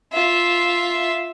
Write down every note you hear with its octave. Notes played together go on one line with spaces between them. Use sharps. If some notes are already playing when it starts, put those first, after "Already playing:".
F4 E5